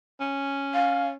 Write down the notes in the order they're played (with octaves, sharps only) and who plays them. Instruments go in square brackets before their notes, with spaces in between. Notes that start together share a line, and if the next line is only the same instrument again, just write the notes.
[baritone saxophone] C#4
[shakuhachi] F5